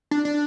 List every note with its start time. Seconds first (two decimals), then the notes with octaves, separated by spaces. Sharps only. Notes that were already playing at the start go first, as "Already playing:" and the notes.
0.11 D4
0.25 D4